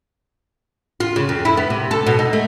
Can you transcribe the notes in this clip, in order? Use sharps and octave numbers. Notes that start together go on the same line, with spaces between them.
F4
C#3
F2
E4
B3
C3
A4
B2
D#4
A3